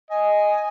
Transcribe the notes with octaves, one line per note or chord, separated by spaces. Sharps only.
D#5 G#5